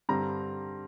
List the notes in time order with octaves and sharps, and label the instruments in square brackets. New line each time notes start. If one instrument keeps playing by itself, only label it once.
[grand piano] G2 D3 G3 C4 A#5